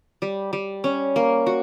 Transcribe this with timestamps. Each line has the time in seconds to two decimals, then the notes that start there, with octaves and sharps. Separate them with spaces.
0.22 G3
0.53 G3
0.84 C#4
1.16 A#3
1.47 F#4